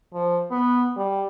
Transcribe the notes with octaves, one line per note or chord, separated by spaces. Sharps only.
F3
B3
G3